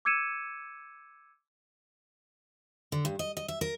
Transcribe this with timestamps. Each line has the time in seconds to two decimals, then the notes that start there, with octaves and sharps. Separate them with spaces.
0.05 D6 E6 G#6 C#7 D#7 E7
2.92 D3
3.05 G2
3.19 D#5
3.37 D#5
3.48 E5
3.61 A#4